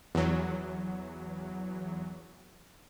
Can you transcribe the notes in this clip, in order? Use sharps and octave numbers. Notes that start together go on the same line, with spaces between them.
E2 F#3